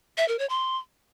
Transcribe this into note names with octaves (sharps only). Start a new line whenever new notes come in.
E5
A#4
C#5
C6